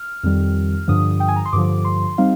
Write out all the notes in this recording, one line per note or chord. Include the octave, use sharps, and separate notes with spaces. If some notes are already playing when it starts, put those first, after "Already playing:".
Already playing: F6
F2 D#3 G3
G2 D3 F3 D#6
G5
G#5
A#5
C6
G2 D3 F3 D6
C6
G3 C4 D#4 F5